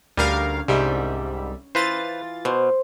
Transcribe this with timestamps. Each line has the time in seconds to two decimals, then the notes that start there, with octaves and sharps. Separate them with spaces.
0.17 D2 G3 C#4 D4 G4 A#4 F5
0.68 C2 G#2 G3 E5
1.75 E3 F4 B4 C5 A6
2.45 B2 C5